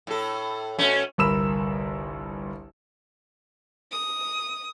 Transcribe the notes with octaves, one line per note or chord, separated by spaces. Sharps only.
A2 A4
B2 A3 C#4
G1 C2 A#4 B5 E6 E7
D#6